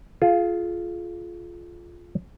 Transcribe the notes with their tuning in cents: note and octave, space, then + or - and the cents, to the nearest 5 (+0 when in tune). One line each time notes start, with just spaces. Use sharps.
F4 -5 G#4 +35